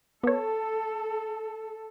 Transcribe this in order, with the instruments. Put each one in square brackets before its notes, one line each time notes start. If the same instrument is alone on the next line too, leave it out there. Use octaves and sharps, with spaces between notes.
[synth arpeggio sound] B3 C#5 [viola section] A4